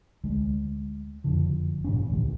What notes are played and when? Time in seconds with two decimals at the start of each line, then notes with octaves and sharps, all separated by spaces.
0.24 D2 G#3
1.24 F#1 F2 D3 F3
1.84 G#2 B2 E3 C#4
2.10 D2 A#2 E3